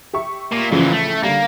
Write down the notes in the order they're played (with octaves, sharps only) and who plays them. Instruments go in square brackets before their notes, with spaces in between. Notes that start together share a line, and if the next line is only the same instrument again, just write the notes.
[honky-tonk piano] G4 E5 C#6
[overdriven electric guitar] A#2
[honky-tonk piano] A1 C#3 F3 [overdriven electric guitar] A#2 E3
[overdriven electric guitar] A3
[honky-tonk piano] D3 G3 [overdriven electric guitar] A#3